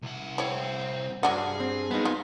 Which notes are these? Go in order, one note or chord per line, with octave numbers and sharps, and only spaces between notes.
C2 F#5
C4 E4 C#5
G2 F#3 D4 G#4 F#5
C4
G#3 B3 D#4
F4